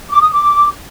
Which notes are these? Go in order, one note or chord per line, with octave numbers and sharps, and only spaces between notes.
D6
D#6
D6